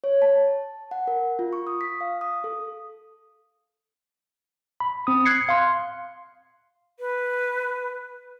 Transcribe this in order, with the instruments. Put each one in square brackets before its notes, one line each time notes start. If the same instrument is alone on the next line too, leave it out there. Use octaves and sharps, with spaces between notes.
[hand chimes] C#5
A5
F#5
A#4
F4
C#6
D#6
B6
F5
D#6
A4
[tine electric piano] B5
C4 D#6
F#6 G#6 C7 C#7
F5 C6
[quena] B4